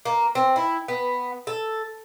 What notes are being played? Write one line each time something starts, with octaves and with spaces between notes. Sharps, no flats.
A#3
C4
E4
B3
A4